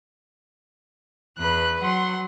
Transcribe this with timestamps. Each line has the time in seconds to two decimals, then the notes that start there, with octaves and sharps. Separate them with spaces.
1.38 E2 B4 F#6
1.81 F#3 F#5 C6